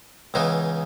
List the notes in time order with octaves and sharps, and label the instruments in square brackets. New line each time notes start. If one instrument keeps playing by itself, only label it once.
[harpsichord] C#2 C#3 E3 B3 D#4